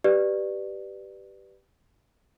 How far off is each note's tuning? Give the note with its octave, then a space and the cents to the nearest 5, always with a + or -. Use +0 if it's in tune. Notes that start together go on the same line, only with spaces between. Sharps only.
G4 -15 B4 +0 D5 +15